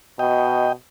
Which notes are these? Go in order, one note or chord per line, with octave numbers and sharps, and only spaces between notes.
B2 D#5 G5